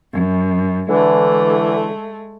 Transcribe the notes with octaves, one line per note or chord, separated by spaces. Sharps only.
F#2
D3 E3 G#3 A3